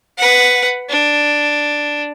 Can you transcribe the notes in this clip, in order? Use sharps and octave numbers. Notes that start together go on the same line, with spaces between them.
B4 F#5
D4